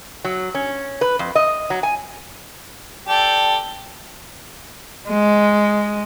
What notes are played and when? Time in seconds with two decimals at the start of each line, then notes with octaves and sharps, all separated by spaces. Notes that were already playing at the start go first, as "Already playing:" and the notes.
0.24 F#3
0.55 C#4
1.01 B4
1.19 F2
1.35 D#5
1.70 F#3
1.83 G#5
3.08 G4 A4 D5
5.09 G#3